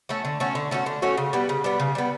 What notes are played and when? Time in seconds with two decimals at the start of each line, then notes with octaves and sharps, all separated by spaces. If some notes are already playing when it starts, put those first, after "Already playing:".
0.09 A3 C#4 F#4
0.25 D3
0.40 A3 C#4 F#4
0.55 D3
0.71 A3 C#4 F#4
0.86 D3
1.02 A3 C#4 F#4
1.17 C#3
1.33 G3 B3
1.49 C#3
1.64 G3 B3
1.80 C#3
1.95 G3 B3